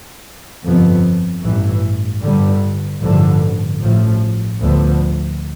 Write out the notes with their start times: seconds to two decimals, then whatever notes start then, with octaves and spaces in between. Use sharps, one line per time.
0.63 G1 F2 C3 F3 B3
1.42 A1 G2 E3
2.22 G1 G2 D3 G3
3.01 A1 G2 D3 F3
3.80 A1 A2 F3
4.60 D2 D3 F3 B3